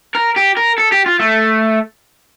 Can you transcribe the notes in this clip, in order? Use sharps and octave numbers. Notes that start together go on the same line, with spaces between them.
A#4
G4
A#4
A4
G4
F4
A3